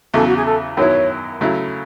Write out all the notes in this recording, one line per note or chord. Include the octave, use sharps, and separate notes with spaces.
E2 C#3 F#3 A4
F#4
G#4
A4
F#2 D#3 F#3 B3 E4 C#5
C#3 F#3 A3 E4